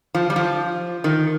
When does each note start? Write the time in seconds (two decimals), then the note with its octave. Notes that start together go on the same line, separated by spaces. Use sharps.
0.15 F3
0.30 G3
0.36 F3
1.04 D#3